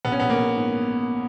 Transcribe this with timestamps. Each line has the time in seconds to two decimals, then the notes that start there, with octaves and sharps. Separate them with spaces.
0.05 A#1 B3
0.12 C#4
0.20 A#1 B3
0.30 A#3
0.38 A#1
0.55 G#2